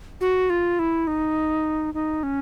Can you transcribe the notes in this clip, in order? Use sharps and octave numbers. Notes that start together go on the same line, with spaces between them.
F#4
F4
E4
D#4
D#4
C#4